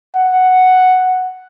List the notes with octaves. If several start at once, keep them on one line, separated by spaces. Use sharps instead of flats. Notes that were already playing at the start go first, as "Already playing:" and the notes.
F#5